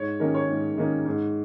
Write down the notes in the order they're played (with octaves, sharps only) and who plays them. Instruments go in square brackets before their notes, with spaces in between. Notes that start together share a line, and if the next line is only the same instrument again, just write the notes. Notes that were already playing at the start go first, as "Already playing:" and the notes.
Already playing: [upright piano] G#2 C#5
D#3 A#3 C#4 A#4
C#5
G#2
D#3 A#3 C#4
G#2